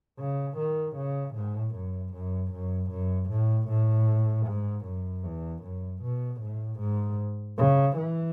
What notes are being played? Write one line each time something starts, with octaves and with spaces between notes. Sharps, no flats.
C#3
D#3
C#3
A2
F#2
F#2
F#2
F#2
A2
A2
G#2
F#2
E2
F#2
B2
A2
G#2
C#3
E3